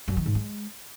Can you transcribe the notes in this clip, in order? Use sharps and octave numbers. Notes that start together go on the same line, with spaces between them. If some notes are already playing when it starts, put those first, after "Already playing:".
F#2
D#3
G#2
G#3